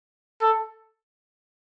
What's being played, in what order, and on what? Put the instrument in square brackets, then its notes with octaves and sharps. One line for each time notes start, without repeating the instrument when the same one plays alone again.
[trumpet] A4